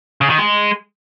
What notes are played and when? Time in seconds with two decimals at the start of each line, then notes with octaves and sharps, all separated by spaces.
0.21 C#3
0.30 D#3
0.38 G#3